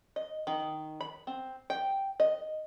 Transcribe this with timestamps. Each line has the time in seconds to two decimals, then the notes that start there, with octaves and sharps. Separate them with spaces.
0.16 D#5
0.47 D#3
1.01 B5
1.27 C4
1.70 G5
2.20 D#5